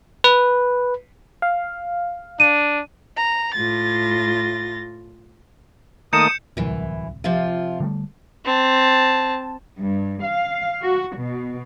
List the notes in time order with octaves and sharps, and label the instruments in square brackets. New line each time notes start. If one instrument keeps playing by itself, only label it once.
[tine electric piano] B4
[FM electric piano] F5
[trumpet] D4 [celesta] D#7
[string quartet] A#5
A2 F4 A6 A#6
[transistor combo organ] D#3 A3 A#3 [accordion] D#6 [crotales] G6 C#7 E7
[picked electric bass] D1 C2 [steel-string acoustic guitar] F#2 E3
[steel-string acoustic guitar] C3 F3 F4
[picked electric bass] D3 G3 A3
[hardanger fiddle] C4 A5
[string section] G2
F5
F#4
B2